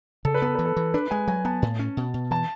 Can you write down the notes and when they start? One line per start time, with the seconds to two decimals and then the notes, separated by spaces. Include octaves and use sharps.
0.25 C#3 A4
0.34 B4
0.42 B3 A4
0.55 E3 B4
0.65 A4
0.77 E3
0.94 D4 B4
1.11 G#3 G#5
1.28 F#3 G#5
1.45 B3 A5
1.62 A2
1.79 C#4
1.97 B2
2.14 B2
2.31 E3 A5